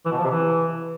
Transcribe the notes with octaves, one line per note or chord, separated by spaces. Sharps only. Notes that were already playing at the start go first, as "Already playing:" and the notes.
E3
B2
F3
C3
E3